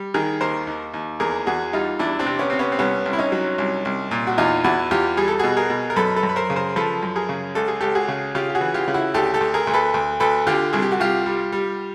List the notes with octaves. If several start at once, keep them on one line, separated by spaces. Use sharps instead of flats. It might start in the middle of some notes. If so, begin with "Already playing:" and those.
Already playing: G3
D#3 G#4 A#4
D#2 A#4 C5
D#2
D#2
E2 G#4 A#4
E2 F#4 G#4
G3 D#4 F4
E2 D4 E4
C4 D4
C3
B3 C#4
C3 C4
B3 C#4
C4
C2 B3 C#4
C2
E4
C#4 D#4
F#3
C2
C2
A#2
F#4
E2 D#4 F4
E2 E4 F#4
E2 F4 G4
G3 G#4
A4
B2 F#4 G#4
G#4 A#4
B2
A#4
F#2 A4 B4
A4 B4
F#2
B4
A#4 C5
C#3
A#4 C5
F3 A4 B4
F#2
G#4 A#4
C#3
C#2 A4
G#4
C#2 G4 A4
F#4 G#4
C#3
C#3 F4 G4
G4
F#4 G#4
E3
F4 G4
C#3
E4 F#4
D2 G4 A4
G4 A4
D2
G#4 A#4
D2
A4 B4
D2
D2 A4 B4
D3 F4 G4
C2 G#4
G4
F#4
C2 F4 G4
G3
G3